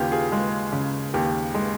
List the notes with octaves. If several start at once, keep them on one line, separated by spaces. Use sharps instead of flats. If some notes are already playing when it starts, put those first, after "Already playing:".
Already playing: D#2 C#3 F4 G4
F4 G#4
G#3
C#3
D#2 G4
G#3